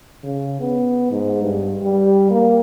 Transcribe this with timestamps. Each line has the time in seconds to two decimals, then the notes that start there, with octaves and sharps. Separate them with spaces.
0.24 C#3
0.60 B3
1.11 G#2
1.43 G2
1.83 G3
2.30 A#3